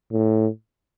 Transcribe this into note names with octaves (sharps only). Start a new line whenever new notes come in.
A2